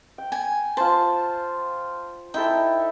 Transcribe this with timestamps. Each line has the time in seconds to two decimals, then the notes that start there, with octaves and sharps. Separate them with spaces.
0.18 G5
0.32 G#5
0.77 F4 C5 A5
2.34 D#4 E4 A4 G5